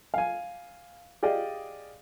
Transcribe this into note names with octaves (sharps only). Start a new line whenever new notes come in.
F5 G#5
G4 G#4 D5 D#5 F5